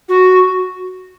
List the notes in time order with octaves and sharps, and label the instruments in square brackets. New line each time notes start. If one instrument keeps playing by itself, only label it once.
[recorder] F#4